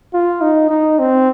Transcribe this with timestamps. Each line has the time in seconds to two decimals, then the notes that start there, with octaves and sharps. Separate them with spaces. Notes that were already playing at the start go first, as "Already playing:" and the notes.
0.14 F4
0.41 D#4
0.70 D#4
0.99 C4